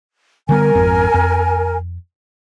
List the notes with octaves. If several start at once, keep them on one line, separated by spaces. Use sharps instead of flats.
D3 G3 B3 A#4 G#5
G#1 F2 C4
F2